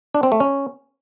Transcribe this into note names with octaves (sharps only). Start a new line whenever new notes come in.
D4
C4
A3
C#4